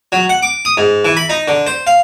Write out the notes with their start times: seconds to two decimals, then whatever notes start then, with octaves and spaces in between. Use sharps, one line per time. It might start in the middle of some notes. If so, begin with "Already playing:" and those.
0.12 F#3
0.29 F#5
0.42 D6
0.65 D#6
0.77 G#2
1.05 E3
1.17 B5
1.30 D#4
1.48 D3
1.67 C5
1.87 F5